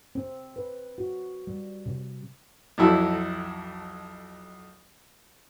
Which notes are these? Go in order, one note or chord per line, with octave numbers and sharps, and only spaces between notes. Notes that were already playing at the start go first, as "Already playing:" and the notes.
C4
B4
F#4
G3
C3
B1 F2 F#3 E4 A4